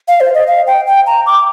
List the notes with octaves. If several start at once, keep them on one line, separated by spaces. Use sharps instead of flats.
F5
C5
D#5
F5
G5
G5
A#5
D6